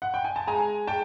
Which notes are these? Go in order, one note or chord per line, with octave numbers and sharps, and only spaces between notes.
F#5
G5
G#5
A5
G#3 G#5 A#5
G#3 G5 A5